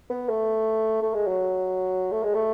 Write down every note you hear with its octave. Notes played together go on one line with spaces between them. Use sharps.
B3
A3
A3
G#3
F#3
A3
G#3
A3